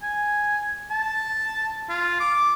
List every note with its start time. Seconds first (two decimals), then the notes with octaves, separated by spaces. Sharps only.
0.03 G#5
0.91 A5
1.89 F4
2.20 D6